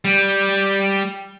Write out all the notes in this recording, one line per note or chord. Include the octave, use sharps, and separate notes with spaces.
G3